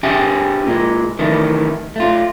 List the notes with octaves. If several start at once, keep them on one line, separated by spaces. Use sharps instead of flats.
D4 G4 G#4 E5 G5
A#2 G#3
D#3 E3 A3
A3 F4